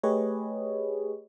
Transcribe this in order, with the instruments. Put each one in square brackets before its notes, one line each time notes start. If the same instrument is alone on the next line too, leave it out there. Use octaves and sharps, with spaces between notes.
[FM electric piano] A3 G4 G#4 B4 C#5 D#5